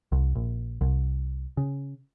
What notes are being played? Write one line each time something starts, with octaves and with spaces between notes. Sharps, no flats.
C2
A#1
C2
C#3